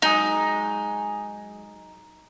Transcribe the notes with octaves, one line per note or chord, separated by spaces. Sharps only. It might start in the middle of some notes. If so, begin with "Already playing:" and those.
F#3 G#3 D#4 G#4